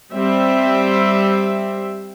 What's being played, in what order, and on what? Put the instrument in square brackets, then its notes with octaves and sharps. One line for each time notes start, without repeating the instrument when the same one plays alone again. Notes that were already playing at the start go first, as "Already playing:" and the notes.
[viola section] G3 C4 E5